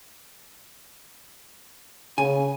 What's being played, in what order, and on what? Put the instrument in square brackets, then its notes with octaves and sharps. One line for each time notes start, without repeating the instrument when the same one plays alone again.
[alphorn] C#3 [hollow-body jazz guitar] G#5